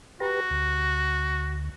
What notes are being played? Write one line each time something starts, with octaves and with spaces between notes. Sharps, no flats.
F#4 G4 B4 A#5
D2